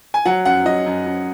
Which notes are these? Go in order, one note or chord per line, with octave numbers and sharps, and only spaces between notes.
G#5
F#3 F#5
F#2 F#5
F#3 D#5
F#2
F#2